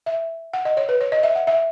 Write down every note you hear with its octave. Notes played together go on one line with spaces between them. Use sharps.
E5
F#5
D#5
C#5
B4
C#5
D#5
E5
F#5
E5